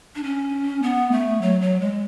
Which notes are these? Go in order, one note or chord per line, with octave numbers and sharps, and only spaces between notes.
D4
C#4
B3
A3
F#3
F#3
G#3